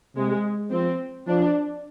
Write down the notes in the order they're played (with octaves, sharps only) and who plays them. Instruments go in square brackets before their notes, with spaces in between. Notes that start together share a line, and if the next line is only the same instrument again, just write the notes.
[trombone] C3 [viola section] G#3
[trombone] F3 [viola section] C4
[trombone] F3 [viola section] D4